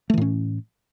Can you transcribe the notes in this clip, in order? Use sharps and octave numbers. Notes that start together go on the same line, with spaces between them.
A2 E3 A3 C#4